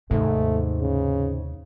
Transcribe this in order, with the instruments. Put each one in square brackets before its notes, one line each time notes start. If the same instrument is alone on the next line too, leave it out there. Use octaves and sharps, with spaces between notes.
[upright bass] D#2 C3 [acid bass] G#2 [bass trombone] A3
[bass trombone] C#3